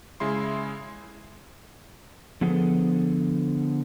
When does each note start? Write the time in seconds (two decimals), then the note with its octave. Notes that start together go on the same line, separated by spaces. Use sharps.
0.20 C#3 G#3 E4 C6
2.41 D3 F3 B3 G#4 A4